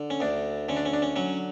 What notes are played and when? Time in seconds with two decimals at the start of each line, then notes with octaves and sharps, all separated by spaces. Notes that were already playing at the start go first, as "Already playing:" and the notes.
Already playing: D3
0.10 C#4
0.20 D2 D4
0.69 D3 C#4
0.77 D4
0.85 C#4
0.93 D4
1.02 C#4
1.16 F#3 C#4